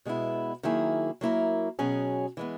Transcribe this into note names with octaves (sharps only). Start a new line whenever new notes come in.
B2 G#3 B3 E4
D#3 F#3 A#3 E4 G#4
F#3 A#3 E4 A#4
B2 F#3 C#4 G#4
E3 G#3 B3